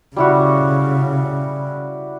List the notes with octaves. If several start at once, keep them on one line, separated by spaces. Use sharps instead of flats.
C#3 G3 E4 F#4